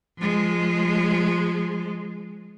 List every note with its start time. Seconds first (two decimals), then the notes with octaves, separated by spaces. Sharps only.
0.19 F3 G#3